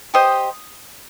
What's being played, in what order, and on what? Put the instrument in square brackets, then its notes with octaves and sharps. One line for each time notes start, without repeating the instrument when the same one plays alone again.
[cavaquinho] G4 C5 D#5 D#6